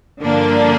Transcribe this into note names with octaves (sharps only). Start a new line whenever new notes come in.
G2 D3 F3 A#3 D4